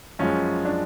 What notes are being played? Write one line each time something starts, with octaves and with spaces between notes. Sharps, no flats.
F#2 F3 G#3 C#4
D4